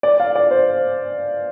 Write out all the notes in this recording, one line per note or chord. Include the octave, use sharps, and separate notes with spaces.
D5
F5
D5
C5